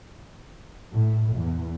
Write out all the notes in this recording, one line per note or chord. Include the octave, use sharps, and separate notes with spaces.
A2
E2